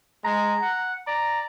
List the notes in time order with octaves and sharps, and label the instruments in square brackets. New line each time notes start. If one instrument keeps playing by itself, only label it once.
[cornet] G#3 [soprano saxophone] A#5
[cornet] F#5
[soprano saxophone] D5 [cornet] A#5